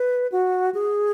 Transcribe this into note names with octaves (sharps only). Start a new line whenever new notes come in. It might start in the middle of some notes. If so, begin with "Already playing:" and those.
Already playing: B4
F#4
G#4